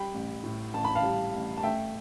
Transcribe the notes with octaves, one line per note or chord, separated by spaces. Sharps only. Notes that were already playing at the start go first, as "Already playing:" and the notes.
Already playing: G3 G5 B5
A1
A2
A1 A5
B5
F5 A5
G3
A1
A5
A3 E5 G5